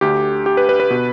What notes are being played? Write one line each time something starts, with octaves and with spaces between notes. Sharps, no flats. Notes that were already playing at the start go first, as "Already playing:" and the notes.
D2 D3 G4
G4
B4
B4
B4
B2